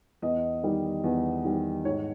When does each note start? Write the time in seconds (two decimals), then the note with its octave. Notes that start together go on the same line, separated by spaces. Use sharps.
0.22 E2 D#5
0.63 D#3 G3
1.04 E2
1.45 D#3 G3
1.85 G#2 C#5